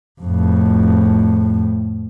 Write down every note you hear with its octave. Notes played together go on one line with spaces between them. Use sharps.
F2 A2